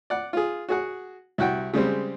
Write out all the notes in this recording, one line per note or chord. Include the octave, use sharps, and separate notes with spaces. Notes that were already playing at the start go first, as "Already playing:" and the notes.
D5 F#5
F4 G#4
F#4 G#4 F#5
C2 E4 F#4 F#5 G5
C#3 G3 G#3 C4